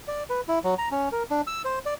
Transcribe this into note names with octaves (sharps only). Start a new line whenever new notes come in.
D5
B4
E4
F#3
A#5
C#4
A#4
D4
E6
C5
D5